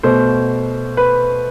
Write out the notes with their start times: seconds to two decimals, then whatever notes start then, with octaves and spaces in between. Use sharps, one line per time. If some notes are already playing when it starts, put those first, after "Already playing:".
0.03 B2 A3 C5
0.97 B4